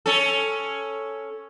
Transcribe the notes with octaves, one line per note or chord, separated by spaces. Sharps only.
C#4 A4